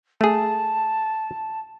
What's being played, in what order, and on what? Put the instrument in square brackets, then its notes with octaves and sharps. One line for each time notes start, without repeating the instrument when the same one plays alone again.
[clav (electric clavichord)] A3 G#4 [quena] A5